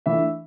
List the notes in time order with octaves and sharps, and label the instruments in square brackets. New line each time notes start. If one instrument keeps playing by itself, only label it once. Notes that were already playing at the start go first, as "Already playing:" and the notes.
[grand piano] E3 A3 D4 E5